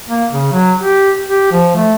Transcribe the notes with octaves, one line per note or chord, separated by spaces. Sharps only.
A#3
C#3
F#3
G4
G4
F3
A3